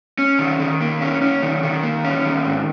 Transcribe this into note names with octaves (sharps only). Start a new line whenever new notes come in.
C#4
D#3
D#3
A#3
C#4
C#4
D#3
D#3
A#3
C#4
D#3
G#2